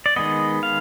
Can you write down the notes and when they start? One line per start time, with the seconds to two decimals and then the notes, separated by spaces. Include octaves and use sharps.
0.06 D5
0.16 D#3 G#3 B3 D#5
0.63 F5